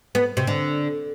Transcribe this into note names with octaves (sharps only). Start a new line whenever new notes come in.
B3
C3
D3